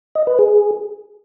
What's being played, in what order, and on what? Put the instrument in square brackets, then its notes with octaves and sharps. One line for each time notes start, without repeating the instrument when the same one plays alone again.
[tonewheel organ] D#5
B4
G#4